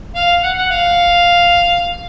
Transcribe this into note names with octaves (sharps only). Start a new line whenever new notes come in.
F5
F#5
F#5
F5